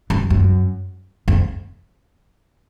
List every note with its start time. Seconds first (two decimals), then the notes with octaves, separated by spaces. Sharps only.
0.10 F#2
0.30 F#2
1.28 F2